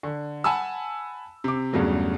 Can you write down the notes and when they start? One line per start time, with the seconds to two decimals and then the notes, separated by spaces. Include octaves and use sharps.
0.03 D3
0.44 F#5 G#5 A5 B5 E6
1.44 C3 D6
1.73 E2 G2 C#3 F#3 A3